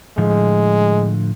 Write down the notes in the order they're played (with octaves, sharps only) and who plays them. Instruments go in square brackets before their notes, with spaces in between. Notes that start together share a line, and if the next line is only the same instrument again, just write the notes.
[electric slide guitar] A2 D3 F3 [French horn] G#3